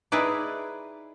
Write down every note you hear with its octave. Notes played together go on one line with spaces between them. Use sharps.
D#4 E4 G#4 B4 D5